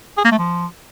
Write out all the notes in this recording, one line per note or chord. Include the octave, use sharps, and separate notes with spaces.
G#4
A#3
A3
F3